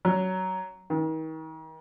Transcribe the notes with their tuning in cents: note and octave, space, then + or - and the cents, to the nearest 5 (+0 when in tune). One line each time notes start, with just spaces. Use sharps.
F#3 +15
D#3 +40